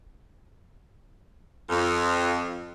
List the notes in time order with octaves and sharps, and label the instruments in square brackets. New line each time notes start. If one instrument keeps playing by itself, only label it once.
[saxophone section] F2